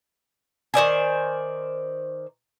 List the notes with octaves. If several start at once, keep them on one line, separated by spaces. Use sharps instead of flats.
D#3 C5 D5 G#5